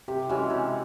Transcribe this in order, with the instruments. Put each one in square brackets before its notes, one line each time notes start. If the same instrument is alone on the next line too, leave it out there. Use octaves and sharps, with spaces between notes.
[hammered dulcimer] C3 [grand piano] G4
[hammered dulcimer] E3 G#3 C#4 [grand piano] F#4
[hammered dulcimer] C3